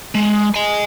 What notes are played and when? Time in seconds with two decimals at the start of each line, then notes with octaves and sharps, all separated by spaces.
0.15 G#3
0.54 D#5 G#5